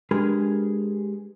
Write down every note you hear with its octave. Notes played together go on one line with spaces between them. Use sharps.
G#3 D4 G4 G#4 A#4 B4